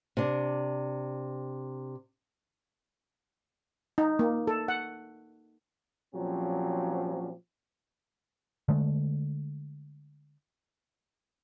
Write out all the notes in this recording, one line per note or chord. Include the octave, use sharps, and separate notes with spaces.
C3 D4
D#4
A#3
A4
F#5
A#2 F3 F#3 C4 C#4 G4
D3 G#3 A3